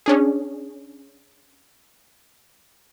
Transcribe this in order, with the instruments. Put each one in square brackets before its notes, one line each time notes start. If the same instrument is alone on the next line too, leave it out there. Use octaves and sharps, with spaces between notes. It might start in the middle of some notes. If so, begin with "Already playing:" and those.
[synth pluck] C#4 D4 G#4